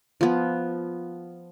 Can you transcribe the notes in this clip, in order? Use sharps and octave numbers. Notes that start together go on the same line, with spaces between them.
F3 B3